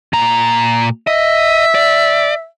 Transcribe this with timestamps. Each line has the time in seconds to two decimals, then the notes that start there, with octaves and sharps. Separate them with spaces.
0.13 A#2 A#5
1.07 D#5 E5
1.75 D5